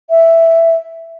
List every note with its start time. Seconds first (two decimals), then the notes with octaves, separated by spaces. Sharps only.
0.10 E5